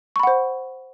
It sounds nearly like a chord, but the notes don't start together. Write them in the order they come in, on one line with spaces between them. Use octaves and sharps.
C#6 B5 F#5 C5